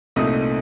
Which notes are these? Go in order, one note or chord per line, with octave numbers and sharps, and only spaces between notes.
C2 A#2 A3 C4 D#4 D#6